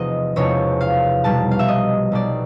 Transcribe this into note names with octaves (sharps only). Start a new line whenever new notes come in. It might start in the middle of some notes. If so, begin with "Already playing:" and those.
Already playing: E1 E2 C3 F3 D#5
E1 E2 C3 F3 C#5
F5
B1 B2 G3 A5
F5
E5
D#5
B1 B2 G3 D5